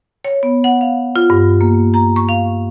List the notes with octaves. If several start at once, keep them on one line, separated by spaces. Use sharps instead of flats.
C#5
B3
F#5
F5
F4
G2
A#3
A#5
C#6
F5